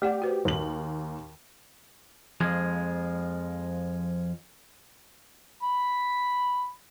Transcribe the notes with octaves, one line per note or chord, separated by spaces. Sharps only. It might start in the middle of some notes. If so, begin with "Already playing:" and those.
A3 G4 D5 F#5
F#4 B4 C5
D#2 F#7
F2 F3 G#3
B5